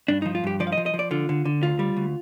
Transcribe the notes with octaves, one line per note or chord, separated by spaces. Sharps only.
G2 D4
F3 D#4
F4
G2 G4
F3 D5
F5
D#5
F3
D#5
F3
D5
D3 F4
D3
D3
D2 F4
G3
D2